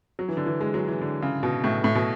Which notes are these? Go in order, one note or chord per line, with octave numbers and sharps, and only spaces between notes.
F#3
E3
D3
E3
G#3
F#3
E3
D3
C#3
B2
A2
A2
B2